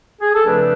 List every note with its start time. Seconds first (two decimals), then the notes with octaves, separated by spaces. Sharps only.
0.22 G#4
0.34 A4
0.46 F2 C#3 F3 A3 D4 B4